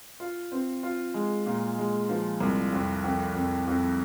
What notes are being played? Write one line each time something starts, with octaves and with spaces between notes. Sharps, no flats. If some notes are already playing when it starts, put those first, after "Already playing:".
F4
C4
F4
G#3
A#2
G#3
F3
C2
F2
F2
F2
F2